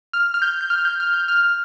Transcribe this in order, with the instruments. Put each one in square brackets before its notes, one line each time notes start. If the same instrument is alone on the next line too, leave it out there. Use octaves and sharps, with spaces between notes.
[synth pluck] F6
F6
G6
G6
F6
G6
F6
G6
F6